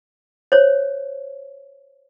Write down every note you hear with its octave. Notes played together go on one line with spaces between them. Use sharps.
C5 C#5